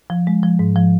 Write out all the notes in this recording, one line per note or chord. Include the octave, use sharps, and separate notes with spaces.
F3
G#3
F3
G#2
F3